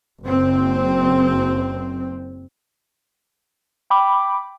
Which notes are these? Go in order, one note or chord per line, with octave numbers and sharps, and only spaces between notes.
F#1 C4
G5 B5 D6